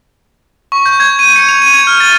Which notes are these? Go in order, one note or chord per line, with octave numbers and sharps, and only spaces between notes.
C#6
G6
G#6
D#7
C#7
F7
D#7
G#6
F6
A6